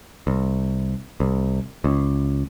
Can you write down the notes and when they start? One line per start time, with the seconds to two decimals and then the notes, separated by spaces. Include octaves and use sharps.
0.27 C2
1.20 C2
1.84 C#2